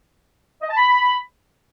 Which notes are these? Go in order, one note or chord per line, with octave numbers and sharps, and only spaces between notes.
D#5
A5
B5